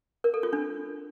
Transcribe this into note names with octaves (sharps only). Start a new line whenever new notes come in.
A#4
A4
F4
D4